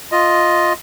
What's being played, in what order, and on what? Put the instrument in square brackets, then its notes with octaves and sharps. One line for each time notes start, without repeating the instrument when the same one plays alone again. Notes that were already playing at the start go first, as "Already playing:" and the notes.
[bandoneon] F4 D#5